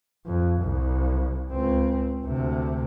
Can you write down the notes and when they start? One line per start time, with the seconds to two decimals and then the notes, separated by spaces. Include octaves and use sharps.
0.26 F2
0.61 C2
1.51 C#2 C4
2.25 D2 C3